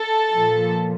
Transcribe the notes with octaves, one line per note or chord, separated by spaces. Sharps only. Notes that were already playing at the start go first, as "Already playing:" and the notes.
Already playing: A4
A#2 F3